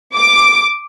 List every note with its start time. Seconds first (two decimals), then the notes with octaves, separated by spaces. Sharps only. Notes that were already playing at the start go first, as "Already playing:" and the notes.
0.15 D6